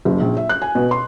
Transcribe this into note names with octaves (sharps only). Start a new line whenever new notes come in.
F#1
A#1
E5
F#6
G#5
B2
C6